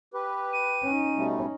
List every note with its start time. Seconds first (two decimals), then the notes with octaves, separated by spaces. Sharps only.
0.14 G4 B4
0.53 D#7
0.84 C#4 D#4
1.17 B2 G3 A3